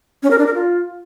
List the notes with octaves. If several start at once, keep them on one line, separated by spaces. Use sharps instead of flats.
C#4
A#4
D4
A#4
F4